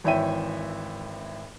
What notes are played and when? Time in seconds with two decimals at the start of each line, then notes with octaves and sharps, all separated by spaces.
0.04 G#1 E3 C#5 E5 G5 D#7